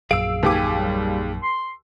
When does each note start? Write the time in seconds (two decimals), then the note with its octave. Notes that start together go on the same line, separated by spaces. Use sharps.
0.11 A#1 F#2 G#4 F5 E6 D7
0.43 D#2 G4 G#5 D6
0.76 F#3 G3
1.43 C6